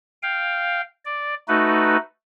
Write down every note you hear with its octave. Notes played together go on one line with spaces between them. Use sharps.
F5 G5
D5
A3 D#4 F#4 B4